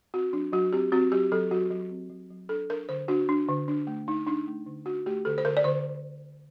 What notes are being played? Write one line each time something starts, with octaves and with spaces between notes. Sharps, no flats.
C4 F#4
F#3 D4
F#3 F#4
C4 G4
C4 F#4
F#3 G4
F#3 A4
F#3 F#4
F#3
C4
F#3
F#3
D4 A4
D4 A#4
D3 C5
D4 F#4
D4
D3
D4
A3
A3 D#4
D4 D#4
A3
D3
D4 F#4
A3 G4
D3 A4
C5
D3 A#4
D5
D3 C5